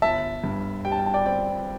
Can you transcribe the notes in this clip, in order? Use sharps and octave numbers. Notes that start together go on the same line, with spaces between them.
G1 E5 A5
G2
G3 G5
A5
G5
A5
D5 G5
C4 D5 G5